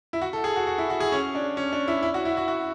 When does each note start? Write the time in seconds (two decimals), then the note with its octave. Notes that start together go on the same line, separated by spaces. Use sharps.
0.13 E4
0.21 F#4
0.33 A4
0.44 G#4
0.56 F#4
0.67 F#4
0.78 E4
0.90 F#4
1.00 G#4
1.12 C#4
1.35 D4
1.57 C#4
1.72 D4
1.88 E4
2.03 E4
2.14 F#4
2.25 E4
2.37 F#4
2.48 F#4